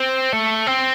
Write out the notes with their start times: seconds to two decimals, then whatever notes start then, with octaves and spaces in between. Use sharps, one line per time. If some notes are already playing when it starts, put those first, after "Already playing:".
Already playing: C4
0.33 A3
0.67 C4